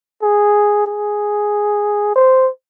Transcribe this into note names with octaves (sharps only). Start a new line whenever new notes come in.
G#4
G#4
C5